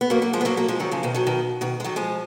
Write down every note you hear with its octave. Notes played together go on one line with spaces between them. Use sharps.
B3
F#3 A#3
F#3 A#3
F3 G#3
B3
F#3 A#3
F#3 A#3
F3 G#3
D#3 F#3
C#3 F3
B2 D#3
D#3 F#3
B2 D#3
B2 D#3
G#3
D#3 F#3
F3 G#3